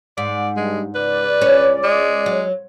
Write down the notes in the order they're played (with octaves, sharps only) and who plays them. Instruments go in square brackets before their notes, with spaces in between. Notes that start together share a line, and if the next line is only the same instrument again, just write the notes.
[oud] G#2 [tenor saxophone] D5
[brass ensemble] G2 [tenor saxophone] G#3
[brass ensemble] C#2 D5 [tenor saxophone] B4
[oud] C#4
[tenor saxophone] G#3
[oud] F#3